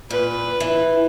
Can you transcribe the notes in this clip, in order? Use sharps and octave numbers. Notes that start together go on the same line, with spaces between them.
A#2 B4
E3